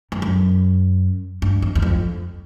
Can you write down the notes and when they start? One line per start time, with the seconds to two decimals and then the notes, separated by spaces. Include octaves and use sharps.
0.12 F2
0.22 F#2
1.42 G2
1.62 F2
1.75 E2
1.82 F2